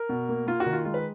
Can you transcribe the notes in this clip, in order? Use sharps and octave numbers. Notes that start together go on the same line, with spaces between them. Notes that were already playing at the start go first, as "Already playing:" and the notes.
Already playing: A#4
B2
A#3
A#3 F4
F#4
D#3
F4
G#3 F4
B4